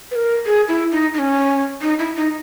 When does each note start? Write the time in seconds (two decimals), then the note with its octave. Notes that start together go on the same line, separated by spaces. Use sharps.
0.11 B4
0.15 A#4
0.46 G#4
0.68 E4
0.91 D#4
1.14 D#4
1.19 C#4
1.82 D#4
1.99 E4
2.16 D#4